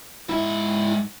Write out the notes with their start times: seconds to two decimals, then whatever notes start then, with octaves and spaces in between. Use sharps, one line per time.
0.29 G#2 E4 E5